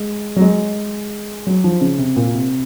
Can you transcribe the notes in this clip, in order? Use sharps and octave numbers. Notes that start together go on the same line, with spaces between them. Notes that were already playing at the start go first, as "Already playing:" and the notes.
Already playing: G#3
F#3
G#3
F#3
F3
C#3
C3
A#2
C3